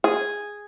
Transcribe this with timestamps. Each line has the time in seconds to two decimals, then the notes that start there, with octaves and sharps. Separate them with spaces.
0.04 G#4